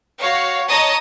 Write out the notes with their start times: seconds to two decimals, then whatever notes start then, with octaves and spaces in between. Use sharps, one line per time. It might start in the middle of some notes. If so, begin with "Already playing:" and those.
0.20 F#4 C#5 F5
0.67 C#5 D#5 A5 A#5 D#6